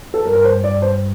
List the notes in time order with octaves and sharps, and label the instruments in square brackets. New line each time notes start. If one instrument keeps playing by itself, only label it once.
[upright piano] A4
[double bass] G2 [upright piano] A#4
[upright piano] A#4
C5
D5
C5